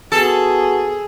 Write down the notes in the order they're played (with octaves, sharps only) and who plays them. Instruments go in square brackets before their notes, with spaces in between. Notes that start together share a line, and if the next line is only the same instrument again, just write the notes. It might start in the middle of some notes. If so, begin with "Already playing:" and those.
[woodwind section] B3 F#4 [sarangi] G#4 [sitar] A4